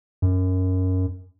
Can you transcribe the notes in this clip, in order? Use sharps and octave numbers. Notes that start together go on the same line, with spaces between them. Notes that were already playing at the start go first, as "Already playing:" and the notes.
F#2